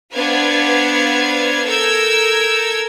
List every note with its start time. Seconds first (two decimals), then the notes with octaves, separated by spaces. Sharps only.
0.15 B3 D4 B4 C5 F5 G#6
1.67 A4 A#4 E6 G6 G#6